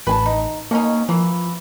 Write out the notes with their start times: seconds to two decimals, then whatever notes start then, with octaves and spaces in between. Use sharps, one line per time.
0.07 A1 B4 G#5 A5
0.26 D#4
0.71 B2 A#3 C#4 D#4
1.09 E3 F3 A#3